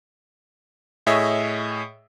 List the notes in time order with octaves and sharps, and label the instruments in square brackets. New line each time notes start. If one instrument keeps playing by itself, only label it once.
[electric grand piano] A2 G#4 C#5 D#5 E5